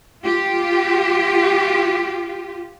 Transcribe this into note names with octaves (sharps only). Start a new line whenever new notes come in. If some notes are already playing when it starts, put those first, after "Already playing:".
F4 G4